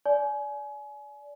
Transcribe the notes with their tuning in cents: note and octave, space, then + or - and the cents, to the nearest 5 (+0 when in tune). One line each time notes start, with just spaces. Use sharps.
D5 -20 G#5 +30